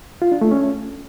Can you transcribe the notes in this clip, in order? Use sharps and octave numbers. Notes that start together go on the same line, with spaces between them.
F4
D4
A3
C#4